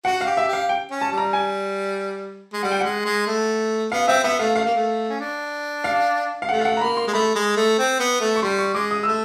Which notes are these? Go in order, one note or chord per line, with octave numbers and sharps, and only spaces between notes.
F#4 F#5
G4 F5
E5
G4
F5
G5
C#4
A5
G3
A#5
G#5
G#3
G3 F#5
G5
G#3 F#5
G#3
A3
B3 F5
C4 E5
B3 E5
A3 F5
A3 F5
A#3
A3
C#4
D4
F5
F5
A3 F#5
F5
F#5
A#5
A#3 B5
C6
G#3
A3 B5
G#3
A3
C4
B3
A3
C#6
G3 C6
C#6
G#3 D6
D#6
A3 E6